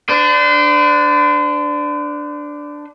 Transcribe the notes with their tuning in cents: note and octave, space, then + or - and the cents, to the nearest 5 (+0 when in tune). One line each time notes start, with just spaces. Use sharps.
D4 +0 C5 -45